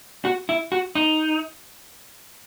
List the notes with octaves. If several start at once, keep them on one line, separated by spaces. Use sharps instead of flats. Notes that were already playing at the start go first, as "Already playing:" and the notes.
F#4
E4
F#4
D#4